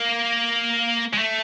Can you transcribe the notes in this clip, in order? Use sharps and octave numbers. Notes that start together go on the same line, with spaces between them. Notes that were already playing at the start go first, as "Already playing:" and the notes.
Already playing: A#3
G#3
A3